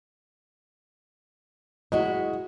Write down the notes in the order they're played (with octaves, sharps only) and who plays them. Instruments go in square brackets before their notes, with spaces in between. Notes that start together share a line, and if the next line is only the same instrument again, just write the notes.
[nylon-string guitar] G#3 E4 F#4 [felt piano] D#5